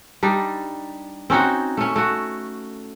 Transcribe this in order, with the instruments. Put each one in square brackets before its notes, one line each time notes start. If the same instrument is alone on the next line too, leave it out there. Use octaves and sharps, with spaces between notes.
[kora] G3 D4 D#4
C4 C#4 D#4 F#4
A3 C#4
A3 F#4